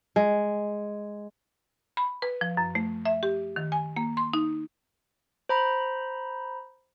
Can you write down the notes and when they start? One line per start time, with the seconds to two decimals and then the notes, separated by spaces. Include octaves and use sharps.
0.16 G#3
1.97 B5
2.22 B4
2.41 F3
2.57 F#2
2.75 A3
3.05 E5
3.23 G4
3.56 D#3
3.72 G#5
3.96 A#3
4.17 C6
4.33 D#4
5.49 C5 A#5 B5